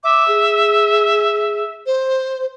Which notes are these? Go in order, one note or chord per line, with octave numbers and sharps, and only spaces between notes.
E5 D6
G#4
C5